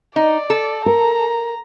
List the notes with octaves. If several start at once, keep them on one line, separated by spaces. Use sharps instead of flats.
D#4 D5
A4
A#4 A#5